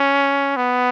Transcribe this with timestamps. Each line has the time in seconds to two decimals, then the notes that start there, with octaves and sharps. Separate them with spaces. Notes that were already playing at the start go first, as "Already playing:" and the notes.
Already playing: C#4
0.57 B3